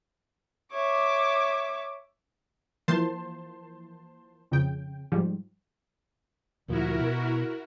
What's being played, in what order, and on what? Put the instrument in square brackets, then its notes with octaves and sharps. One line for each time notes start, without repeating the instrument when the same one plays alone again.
[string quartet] C#5 E5 D6
[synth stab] E3 F3 A#3 C5 A5 C6
F2 C#3 G5
G#2 F3 G3
[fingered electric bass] D2 A#2 F3 [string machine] E4 F#4 A#4
[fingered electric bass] B2